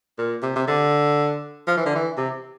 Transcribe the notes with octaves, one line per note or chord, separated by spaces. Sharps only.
A#2
C3
C3
D3
F3
E3
D3
E3
C3